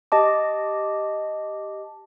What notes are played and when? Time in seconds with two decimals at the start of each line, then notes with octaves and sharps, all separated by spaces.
0.12 G4 D#5 A5 D6